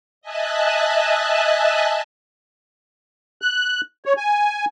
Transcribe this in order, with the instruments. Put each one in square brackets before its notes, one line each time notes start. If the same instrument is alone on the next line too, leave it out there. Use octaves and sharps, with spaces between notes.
[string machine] D#5 E5 G#5 A5 F#6
[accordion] F#6
C#5
G#5